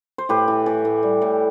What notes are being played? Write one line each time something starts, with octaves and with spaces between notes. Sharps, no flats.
C5
A2 G4 B4
E3
E3
A2
G3
A2